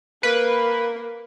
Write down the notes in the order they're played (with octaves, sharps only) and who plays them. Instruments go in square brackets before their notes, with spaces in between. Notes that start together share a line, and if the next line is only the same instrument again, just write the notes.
[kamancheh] A#3 A#4 [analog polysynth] B4